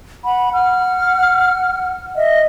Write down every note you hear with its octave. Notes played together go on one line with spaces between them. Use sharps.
F#5 B5
F#5 F6
D#5 E5